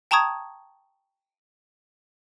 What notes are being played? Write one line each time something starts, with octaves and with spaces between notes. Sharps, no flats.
G5 A5 A#5 C#6 D#6 G#6